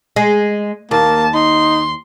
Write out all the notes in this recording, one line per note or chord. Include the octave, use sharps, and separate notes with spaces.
G#3
D#2 A#3 A5
D#4 C6